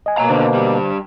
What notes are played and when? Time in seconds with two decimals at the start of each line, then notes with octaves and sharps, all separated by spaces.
0.06 D#5 G#5
0.18 B2 A#3 C#5 A#5
0.29 D3 D#3 D4 C5
0.54 G2 G3